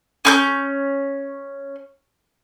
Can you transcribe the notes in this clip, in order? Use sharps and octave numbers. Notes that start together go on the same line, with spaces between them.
C#4 C#6 G6